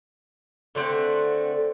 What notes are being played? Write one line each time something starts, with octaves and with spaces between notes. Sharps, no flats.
D3 A3 C4 F#5